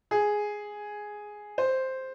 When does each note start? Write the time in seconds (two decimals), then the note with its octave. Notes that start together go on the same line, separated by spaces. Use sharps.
0.11 G#4
1.58 C5